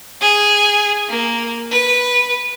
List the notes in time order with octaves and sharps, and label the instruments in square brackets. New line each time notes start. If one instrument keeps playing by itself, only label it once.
[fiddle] G#4
A#3
B4